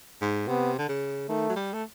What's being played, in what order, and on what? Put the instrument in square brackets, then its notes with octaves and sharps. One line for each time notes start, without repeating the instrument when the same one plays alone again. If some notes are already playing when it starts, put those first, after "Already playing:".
[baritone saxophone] G#2
[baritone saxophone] C3 [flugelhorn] B3
[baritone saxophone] D3
C#3
[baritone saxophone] D#3 [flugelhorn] A3
[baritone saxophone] F#3
G3
A3